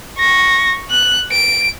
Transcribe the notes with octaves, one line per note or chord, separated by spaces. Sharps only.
C#6 A#6
F#6
D7